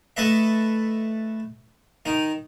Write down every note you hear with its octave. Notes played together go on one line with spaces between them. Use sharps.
A3 A4 B4 D#5 E5
D#3 D#4